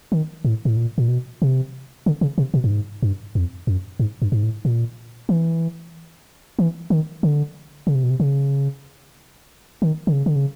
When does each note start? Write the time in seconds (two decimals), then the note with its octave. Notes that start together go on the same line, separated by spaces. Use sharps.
0.12 D#3
0.45 A2
0.65 A2
0.77 A#2
0.98 A#2
1.08 B2
1.42 C3
2.06 D3
2.21 C#3
2.38 C3
2.54 B2
2.64 G2
2.71 G#2
3.02 G2
3.35 F2
3.67 F#2
3.99 G#2
4.22 G2
4.32 G#2
4.43 A2
4.65 A#2
5.29 E3
6.59 E3
6.90 D#3
7.23 D3
7.87 C#3
7.95 C3
8.03 B2
8.10 C3
8.20 C#3
9.82 D#3
10.07 D3
10.13 C#3
10.26 D3
10.36 C#3